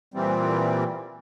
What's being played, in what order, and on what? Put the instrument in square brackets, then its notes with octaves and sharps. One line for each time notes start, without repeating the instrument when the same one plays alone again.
[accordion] A#2 E3 G3 C4